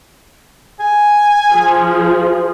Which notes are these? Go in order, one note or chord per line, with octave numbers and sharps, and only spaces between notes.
G#5
F3 G#4